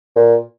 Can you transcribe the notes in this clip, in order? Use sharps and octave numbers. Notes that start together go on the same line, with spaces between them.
A#2